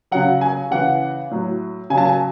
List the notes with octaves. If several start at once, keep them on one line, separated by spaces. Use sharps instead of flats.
C#3 F#3 F#5
G#5
C#3 E3 F#5
A2 F#3
C#3 F#3 G#5 A5
G#5